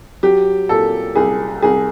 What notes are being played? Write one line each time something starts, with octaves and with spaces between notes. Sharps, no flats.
F#3 G4
A#2 A4
C2 G#4
C2 G#4